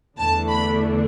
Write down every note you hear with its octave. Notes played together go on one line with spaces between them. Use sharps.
E2 D3 A3 D4 A5
B5